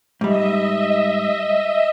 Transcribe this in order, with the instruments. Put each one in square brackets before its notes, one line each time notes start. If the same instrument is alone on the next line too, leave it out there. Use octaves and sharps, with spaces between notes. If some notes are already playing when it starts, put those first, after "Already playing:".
[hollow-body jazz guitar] G#2 G3 [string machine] D#5 E5